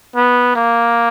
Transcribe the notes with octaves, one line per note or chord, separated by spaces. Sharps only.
B3
A#3